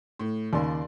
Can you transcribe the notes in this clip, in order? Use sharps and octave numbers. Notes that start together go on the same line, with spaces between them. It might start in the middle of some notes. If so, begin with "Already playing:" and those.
A2
D#2 C#3 D5 C6